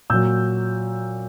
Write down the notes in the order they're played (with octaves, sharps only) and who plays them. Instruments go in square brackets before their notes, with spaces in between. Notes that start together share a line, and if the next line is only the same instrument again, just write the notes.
[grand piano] A#2 F#3 E6 G6